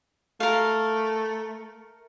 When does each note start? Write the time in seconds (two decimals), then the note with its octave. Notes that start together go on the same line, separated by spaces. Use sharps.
0.40 A3 A#4 F5